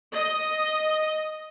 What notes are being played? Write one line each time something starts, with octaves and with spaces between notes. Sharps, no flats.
D#5